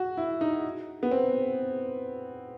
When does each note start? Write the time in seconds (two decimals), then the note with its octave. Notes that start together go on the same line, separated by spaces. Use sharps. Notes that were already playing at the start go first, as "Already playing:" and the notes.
Already playing: F#4
0.17 E4
0.41 D#4
1.03 B3
1.11 C4